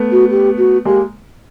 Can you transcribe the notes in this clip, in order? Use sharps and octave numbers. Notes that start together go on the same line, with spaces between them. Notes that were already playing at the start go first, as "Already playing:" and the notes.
Already playing: A3 B3
F#4
G4
F#4
G#3 A#3 G4